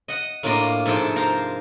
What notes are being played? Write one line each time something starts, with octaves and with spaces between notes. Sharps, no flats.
D#5 F#5
A2 A#3 D4 F4 D5 D#5
G#2 C3 F3 A4 G5 A5
A#4 C5 F5 A#5